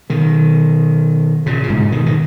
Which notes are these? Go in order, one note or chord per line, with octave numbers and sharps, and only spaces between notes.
B2 D#3
A#2 C#3
C#3
G#2 B2
B2 D#3
D#3